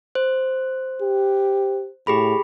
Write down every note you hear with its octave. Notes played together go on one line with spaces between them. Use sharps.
C5
G4
A2 G4 G#4 B5